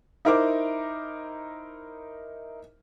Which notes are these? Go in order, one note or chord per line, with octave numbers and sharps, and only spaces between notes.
D#4 E4 A#4 C5 D6